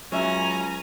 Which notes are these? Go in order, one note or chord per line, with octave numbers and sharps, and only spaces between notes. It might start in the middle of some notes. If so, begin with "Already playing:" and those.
C#2 F#3 C#4 E5 G#5 A#5